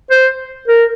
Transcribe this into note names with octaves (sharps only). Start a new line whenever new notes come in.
C5
A#4